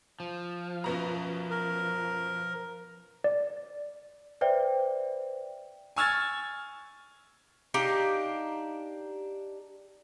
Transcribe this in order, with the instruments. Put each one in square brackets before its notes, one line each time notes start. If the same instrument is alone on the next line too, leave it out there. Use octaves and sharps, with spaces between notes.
[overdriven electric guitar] F3
[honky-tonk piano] F#2 B2 A#5
[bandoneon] A#4
[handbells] D5
[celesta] B4 C5 D5 E5 G5
[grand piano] G#5 C#6 E6 F6 G#6 A6
[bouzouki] D4 D#4 G4 F5